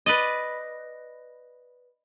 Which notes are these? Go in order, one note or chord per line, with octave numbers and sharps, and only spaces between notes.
B4 D5 D#5